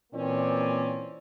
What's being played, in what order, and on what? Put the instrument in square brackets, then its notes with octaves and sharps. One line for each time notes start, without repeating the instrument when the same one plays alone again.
[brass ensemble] A#2 E3 A#3 C4 C#4 D5